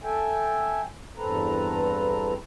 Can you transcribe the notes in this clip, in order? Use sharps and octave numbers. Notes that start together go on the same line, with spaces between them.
A4 E5 G5 G#5
E2 G2 C4 A4 B4 A#5